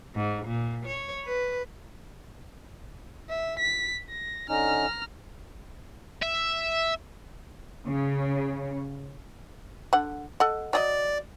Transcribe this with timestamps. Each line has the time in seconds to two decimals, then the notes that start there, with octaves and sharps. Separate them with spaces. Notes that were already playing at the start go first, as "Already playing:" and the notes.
0.15 G#2
0.45 A#2
0.86 C#5
1.25 B4
3.30 E5
3.59 B6
4.10 A#6
4.49 D3 C#4 D#4 A#5 F6
6.23 E5
7.85 C#3
9.93 D3 F#5
10.40 A4 D#5 F#5
10.73 F#3 G#4 D5 D#5